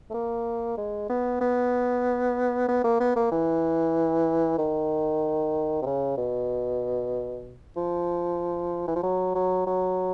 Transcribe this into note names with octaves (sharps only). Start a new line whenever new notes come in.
A3
A#3
G#3
B3
B3
B3
A#3
B3
A#3
E3
D#3
C3
C#3
B2
F3
E3
F3
F#3
F#3
F#3